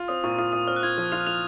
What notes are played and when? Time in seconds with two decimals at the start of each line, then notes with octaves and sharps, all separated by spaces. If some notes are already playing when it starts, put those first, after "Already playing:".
Already playing: F4
0.08 C4 D#6
0.24 A#2 C#6
0.38 F4 D#6
0.52 A#2 D#6
0.67 C4 F6
0.76 F#6
0.83 F4 G#6
0.98 F3
1.12 F4 F7
1.27 F4 F7